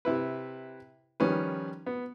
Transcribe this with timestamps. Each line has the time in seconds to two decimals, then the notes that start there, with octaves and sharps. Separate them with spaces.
0.05 C3 E4 B4
1.20 D#3 F3 G3 C#4 B4
1.86 B3